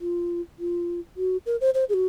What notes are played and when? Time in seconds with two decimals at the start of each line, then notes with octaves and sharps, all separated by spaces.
0.01 F4
0.59 F4
1.17 F#4
1.46 A#4
1.61 C5
1.74 C5
1.89 G#4
1.94 F#4